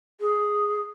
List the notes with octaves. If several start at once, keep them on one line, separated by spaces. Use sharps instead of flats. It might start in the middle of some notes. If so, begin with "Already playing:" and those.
G#4